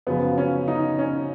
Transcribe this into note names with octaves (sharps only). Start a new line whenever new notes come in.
F#2 C#3 F3 B3
C#4
D#4
C#4